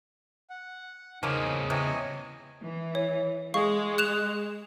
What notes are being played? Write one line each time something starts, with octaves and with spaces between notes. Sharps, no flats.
F#5
E2 C#3 F3 A#3 C#4 D#4
C3 E3 C#5 D#5 G#5
E3
C#5
G#3 F5 C#6
F#6 E7 F7